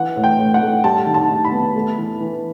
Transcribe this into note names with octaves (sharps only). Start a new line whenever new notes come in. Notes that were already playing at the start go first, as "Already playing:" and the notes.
Already playing: E3 F#5
A2
G5
A2
F#5
A3
G3 A5
D#3
A5
D#3
B5
B3
A3
E3
E3